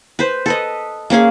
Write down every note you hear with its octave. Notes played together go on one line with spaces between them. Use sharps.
B4 C5
A4 B4 D#5
A#3 C#4 G#4 F5